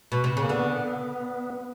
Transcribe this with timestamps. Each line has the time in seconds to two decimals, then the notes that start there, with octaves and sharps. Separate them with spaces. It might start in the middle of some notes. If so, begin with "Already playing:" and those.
0.12 B2
0.24 C3
0.37 C#3
0.43 A#3
0.49 D3 B3